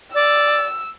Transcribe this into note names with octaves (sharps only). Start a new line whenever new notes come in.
D5 E6